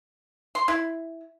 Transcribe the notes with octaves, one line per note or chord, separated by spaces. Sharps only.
C6
E4